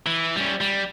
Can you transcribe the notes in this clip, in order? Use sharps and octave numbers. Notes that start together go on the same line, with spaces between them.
E3
G3 C#4
G3